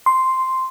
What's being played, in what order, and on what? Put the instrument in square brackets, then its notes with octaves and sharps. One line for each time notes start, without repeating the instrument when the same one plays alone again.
[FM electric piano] C6